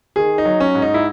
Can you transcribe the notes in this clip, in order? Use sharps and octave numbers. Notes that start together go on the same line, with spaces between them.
D#3 G#4
D#4
F#3
C#4
G#2
D#4
E4